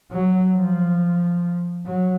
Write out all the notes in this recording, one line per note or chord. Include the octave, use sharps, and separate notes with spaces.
F#3
F3
F#3